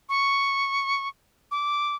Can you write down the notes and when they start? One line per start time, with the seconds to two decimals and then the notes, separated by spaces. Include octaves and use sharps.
0.09 C#6
1.51 D6